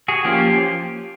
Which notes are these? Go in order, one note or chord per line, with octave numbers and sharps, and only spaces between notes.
F#4 G#4
F3 A#3 C#4 F4 G4